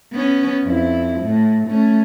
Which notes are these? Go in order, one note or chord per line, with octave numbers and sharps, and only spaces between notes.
B3 C#4
F2 E4
A2
A3 C#4